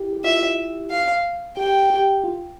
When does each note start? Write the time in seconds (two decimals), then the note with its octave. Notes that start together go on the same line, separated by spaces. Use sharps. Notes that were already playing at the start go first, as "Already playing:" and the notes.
Already playing: E4 G4
0.13 G4
0.24 F4 E5
0.90 F5
1.57 G4 G5
1.90 G4
2.24 F4